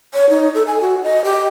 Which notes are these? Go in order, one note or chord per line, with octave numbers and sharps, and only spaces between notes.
C#5
D#4
A4
G#5
F#4
D#5
G4